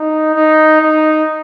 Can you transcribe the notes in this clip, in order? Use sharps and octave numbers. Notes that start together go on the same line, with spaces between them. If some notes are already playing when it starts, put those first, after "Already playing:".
Already playing: D#4
D#4
D#4